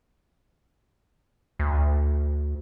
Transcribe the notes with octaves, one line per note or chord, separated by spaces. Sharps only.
D2